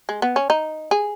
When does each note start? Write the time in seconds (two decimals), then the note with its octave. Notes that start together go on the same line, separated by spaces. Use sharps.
0.09 G#3
0.22 B3
0.36 C#4
0.50 D#4
0.91 G#4